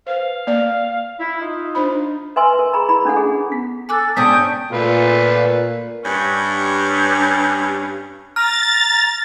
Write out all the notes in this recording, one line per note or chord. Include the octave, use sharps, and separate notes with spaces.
B4 C5 F5
A#3 D5
E4
D#4 F4
D4 C5 B5
B4 E5 G#5 C6 E6
A#4
G#4 A#5 B5
E4 B5
C#4 D4 A4 F#5
G#4
B3
A4 G#5 D6 F#6
G#2 B3 C#4 D4 G5 D#6 G6
A#2 A3 F4 B4
G2 C#4
A#5 F6 A6